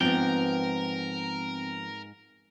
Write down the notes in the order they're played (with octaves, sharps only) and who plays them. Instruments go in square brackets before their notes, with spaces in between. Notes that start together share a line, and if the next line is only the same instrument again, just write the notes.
[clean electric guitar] G#2 G5 [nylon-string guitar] F3 B3 [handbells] C4 [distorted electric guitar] A#4